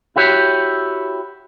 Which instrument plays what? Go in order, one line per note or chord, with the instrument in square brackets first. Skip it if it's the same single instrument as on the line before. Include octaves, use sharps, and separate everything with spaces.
[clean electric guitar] E4 F#4 G4 C#5